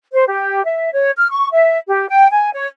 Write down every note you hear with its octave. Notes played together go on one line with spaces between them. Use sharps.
C5
G4
E5
C#5
F6
C#6
E5
G4
G5
G#5
C#5